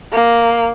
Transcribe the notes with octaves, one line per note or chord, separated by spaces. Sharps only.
A#3